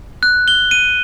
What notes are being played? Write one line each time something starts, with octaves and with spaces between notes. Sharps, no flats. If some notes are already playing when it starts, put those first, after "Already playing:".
F#6
G7
D#7